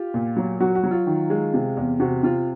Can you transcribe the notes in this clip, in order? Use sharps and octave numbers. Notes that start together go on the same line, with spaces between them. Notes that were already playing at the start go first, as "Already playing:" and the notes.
Already playing: F4 G4
A#2
F#3
F#3 F#4
F#4
F#3
F4
D#3
G#3
C3
E2
C3 F#4
C3 F4